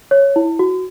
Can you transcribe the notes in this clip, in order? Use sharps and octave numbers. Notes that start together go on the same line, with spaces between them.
C#5
E4
F#4